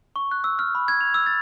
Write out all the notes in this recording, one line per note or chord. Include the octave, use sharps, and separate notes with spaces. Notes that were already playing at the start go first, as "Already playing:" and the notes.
C#6
F#6
E6
F6
B5
G#6
F7
E6
A6